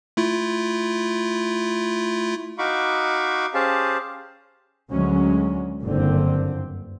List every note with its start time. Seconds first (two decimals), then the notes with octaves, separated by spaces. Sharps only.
0.17 A3 E4 F4
2.58 D#4 F#4 F5 B5 C#6 D6
3.54 C#4 G4 G#4 C5 F5 A5
4.90 D2 F#3 G#3 C#4
5.82 F#1 G2 D3 C4